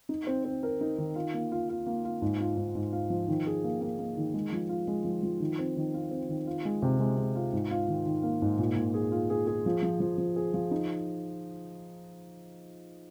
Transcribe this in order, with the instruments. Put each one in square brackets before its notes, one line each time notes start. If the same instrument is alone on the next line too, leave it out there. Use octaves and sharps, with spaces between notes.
[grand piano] D#4
C4
C4
A#4
D#4
D#3
F4
A#3
F4
F4
A#3
F4
G#2
F4
G#2
G#2
F4
F3
D#3
G#4
A#3
A#3
A#3
D#3
G#3
F3
F4
G#3
F3
F3
D#3
C4
D#3
F4
C4
D#3
F4
G#3
C3
G#3
G#3
F4
G#2
F4
D#3
D#3
A#3
G#2
A#2
A#2
G#4
F4
G#4
G#4
F3
F3
F3
F3
G#4
F3
D#4